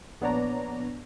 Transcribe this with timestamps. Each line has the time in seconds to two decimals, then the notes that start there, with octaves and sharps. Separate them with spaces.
0.21 A#1 B3 D4 C#5 D5 A#5